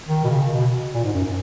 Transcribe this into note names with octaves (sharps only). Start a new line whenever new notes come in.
D#3
B2
C#3
B2
A#2
G#2
F#2